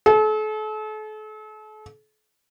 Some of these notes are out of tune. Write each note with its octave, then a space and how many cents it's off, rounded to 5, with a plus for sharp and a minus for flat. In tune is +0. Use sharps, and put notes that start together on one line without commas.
A4 -40